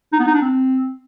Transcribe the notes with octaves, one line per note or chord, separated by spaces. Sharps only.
D#4
B3
D#4
D4
C4